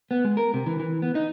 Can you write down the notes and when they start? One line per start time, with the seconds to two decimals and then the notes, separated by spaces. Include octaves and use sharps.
0.11 B3
0.25 G#3
0.37 A#4
0.54 C3
0.66 E3
0.80 E3
1.02 B3
1.15 D#4